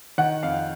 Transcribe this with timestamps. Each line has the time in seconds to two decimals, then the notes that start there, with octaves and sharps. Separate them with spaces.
0.18 D#3 F#5
0.43 F2 F5